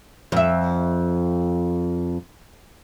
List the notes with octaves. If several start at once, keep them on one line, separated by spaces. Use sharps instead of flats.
F2 E5